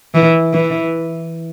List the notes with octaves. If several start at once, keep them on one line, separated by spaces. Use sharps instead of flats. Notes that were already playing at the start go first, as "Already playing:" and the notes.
E3
E3